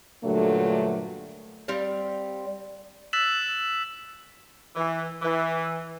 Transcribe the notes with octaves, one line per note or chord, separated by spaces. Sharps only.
G2 A#2 D3 F#3 A3
G3 C4 F5
E6 F#6 A6 B6 E7 F#7
E3
E3